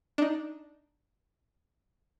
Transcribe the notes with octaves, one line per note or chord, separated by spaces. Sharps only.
D4 D#4